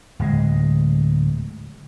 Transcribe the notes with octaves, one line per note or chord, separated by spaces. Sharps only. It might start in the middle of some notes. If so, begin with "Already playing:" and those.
D1 G#3